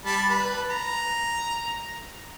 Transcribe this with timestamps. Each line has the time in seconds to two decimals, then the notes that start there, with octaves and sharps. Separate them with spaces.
0.05 G3 A5 B5
0.29 B4
0.70 A#5